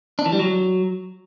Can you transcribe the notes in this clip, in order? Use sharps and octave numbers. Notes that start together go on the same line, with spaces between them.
D4
E3
G3
F#3